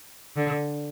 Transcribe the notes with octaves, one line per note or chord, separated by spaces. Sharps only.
D3